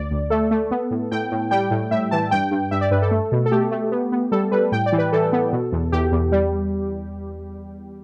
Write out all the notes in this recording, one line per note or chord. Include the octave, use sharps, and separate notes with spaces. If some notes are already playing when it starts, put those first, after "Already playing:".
Already playing: D2 D5
D2
A3 A4
A3
B3
A2
A2 G5
A2
G3 G5
A2
A2 E5
E3 A5
G2 G5
G2
G2 E5
D5
G2 B4
A4
A3
B2
A4
A3 G4
A3
B3
B3
G3 A4
G3 B4
A2 G5
D5
E3
B4
E3 A4
B3
B2
E2
E2 G4
E2
G3